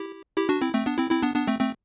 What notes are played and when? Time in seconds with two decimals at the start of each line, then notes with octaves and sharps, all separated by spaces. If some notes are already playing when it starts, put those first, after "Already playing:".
Already playing: E4 G4
0.37 E4 G4
0.49 D4 F#4
0.61 C4 E4
0.73 A3 C4
0.86 B3 D4
0.98 C4 E4
1.11 C4 E4
1.22 B3 D4
1.35 B3 D4
1.47 A3 C4
1.60 A3 C4